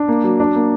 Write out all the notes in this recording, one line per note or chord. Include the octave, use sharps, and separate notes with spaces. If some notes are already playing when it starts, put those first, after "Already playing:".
Already playing: D4
A#3
F#3
D4
A#3